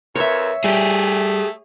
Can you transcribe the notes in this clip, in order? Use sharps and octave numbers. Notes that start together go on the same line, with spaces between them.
F2 A#4 B4 C#5 E5
G3 A3 G4 G#4